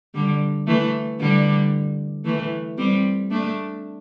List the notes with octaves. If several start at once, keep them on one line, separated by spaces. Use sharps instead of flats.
D3 G3
E3 A3
D3 G3
E3 A3
G3 C4
A3 D4